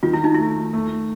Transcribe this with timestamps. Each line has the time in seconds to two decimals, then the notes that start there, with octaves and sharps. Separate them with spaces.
0.03 D#3 F4
0.13 E4
0.24 D#4
0.34 A3 E4
0.73 A3